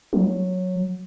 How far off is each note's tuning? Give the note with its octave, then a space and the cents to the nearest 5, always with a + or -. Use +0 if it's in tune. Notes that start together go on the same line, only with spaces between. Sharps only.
F#3 -10